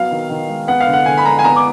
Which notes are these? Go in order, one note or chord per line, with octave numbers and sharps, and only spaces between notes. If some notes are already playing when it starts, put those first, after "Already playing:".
Already playing: F#3 B3 F5
D#3
D#3
G#3
B3 F#5
F5
D3
F#5
D3 G#5
B5
G#3 A#5
G#5
B3 A#5
D6